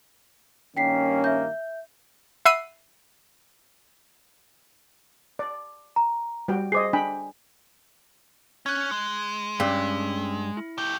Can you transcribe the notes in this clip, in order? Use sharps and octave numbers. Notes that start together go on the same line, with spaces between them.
G2 D#3 A#3 C#4 G5 B6 C7
E5 G6
E5 F#5 B5 E6 C7 D#7
D5
A#5
G3 F#4 G5
G#4 C5 D#5 D6 C7
D4 G5 G#5 B5
C#4 F#6 G#6
G#3
G2 C#4 E6 B6
E4
A3 G4 G6